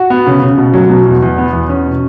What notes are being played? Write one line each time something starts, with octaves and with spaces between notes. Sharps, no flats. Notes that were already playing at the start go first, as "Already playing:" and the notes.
Already playing: F#4
B3
C#3
C#3
B2
F#3
B2
E2
E2
B3
E2
C#4
B2